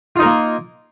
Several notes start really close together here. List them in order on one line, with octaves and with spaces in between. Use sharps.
F4 D#4 A#4 A#3